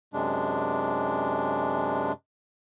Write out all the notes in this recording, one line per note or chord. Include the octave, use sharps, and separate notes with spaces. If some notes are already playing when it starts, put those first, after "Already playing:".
F#2 C3 G#3 D4